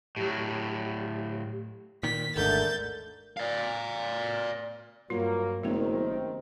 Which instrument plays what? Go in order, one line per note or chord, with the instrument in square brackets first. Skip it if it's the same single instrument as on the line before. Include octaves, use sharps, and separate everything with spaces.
[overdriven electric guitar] A2 F#3 [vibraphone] G4
[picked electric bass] A#2 D#3 [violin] B6
[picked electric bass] G#1 D#2 G#2 [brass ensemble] D3 A3 [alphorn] A#4 [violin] G6 A6
[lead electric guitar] D5 F5
[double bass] G2 [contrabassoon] F#3 [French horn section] A#3 [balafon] F4
[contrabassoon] F#1 [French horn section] C3 D#3 [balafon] A3 B3 [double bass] C4